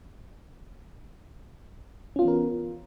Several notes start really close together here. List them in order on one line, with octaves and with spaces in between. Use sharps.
C#4 F4 B3 E3 A#4